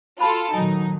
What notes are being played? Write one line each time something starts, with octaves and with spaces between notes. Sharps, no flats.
F4 F#4 A4 A5 B5
A#2 D#3 F#3 D#4 G#5